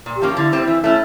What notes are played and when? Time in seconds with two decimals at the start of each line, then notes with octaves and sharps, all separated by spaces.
0.06 A#2
0.16 G4
0.22 F3 A#3 C#4
0.37 D3 E4
0.52 G3 C4
0.67 E3
0.84 A3 C#4